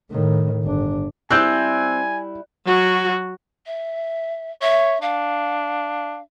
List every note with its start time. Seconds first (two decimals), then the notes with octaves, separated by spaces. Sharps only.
0.11 A2 D#3
0.63 G1 D4
1.31 G3 C4 E4 G#5 F#6 G6
2.66 F#3 F#4
3.66 E5
4.62 C#5 E5
5.02 D4 F5